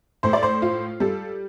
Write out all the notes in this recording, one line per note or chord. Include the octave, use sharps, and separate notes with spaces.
A2 C5
D5
C5
F4
G3 A4